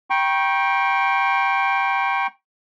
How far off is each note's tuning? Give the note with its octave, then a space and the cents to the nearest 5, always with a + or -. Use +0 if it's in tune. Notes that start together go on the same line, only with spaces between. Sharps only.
G5 +0 A#5 +45 C#6 -25